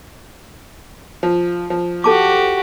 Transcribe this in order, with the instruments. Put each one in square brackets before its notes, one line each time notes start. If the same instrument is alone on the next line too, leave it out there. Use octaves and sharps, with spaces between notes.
[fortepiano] F3
F3
[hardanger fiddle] F#4 G4 [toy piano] A4 A5 D6